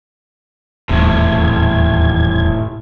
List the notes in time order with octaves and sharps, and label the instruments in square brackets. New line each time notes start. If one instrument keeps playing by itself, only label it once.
[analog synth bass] D#1 [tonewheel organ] E2 G#6 [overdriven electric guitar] A2 C3